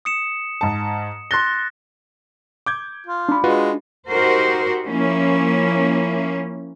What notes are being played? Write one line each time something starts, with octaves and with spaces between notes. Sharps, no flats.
D#6 C#7 E7
G#2 A5
C6 F#6 A6 A#6 G7
D6 G6 G#6
F4
D4 B5
G#3 F4 F#4 B4
D#4 F#4 G4 A#4 C5
F3 A#3 C#4 E4